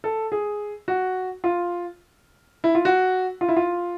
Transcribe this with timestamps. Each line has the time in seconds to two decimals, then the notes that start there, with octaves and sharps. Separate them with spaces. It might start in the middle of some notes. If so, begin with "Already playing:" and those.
0.04 A4
0.32 G#4
0.88 F#4
1.44 F4
2.64 E4
2.75 F4
2.85 F#4
3.41 F4
3.49 E4
3.56 F4